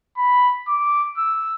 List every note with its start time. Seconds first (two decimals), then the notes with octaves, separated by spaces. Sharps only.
0.17 B5
0.68 D6
1.18 E6